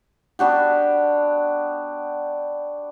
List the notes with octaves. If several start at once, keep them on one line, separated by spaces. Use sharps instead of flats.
B3 D4 F#4 G4